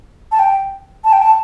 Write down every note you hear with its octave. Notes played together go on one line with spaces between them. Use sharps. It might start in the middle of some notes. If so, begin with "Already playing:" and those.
A5
G5
A5
G5
A5